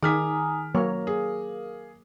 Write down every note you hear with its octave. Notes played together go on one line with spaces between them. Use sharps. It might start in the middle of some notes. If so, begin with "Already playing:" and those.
D#3 G#4 G#5 A#5 D6 D#6 F6 B6
F#3 A#3 A#4 C#5 F5
G#4